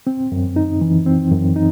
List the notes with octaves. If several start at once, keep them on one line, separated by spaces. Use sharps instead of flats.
C4
F#2
D#4
E3
C4
F#2
D#4